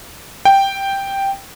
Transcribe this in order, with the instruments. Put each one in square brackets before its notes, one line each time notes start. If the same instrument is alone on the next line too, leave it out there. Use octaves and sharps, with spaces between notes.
[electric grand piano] G5